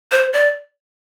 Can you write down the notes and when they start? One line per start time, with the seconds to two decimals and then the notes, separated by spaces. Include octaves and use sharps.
0.12 C5
0.33 D5